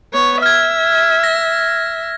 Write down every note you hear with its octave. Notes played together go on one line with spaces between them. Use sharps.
B3 C#5
E5 F6 G#6
A#6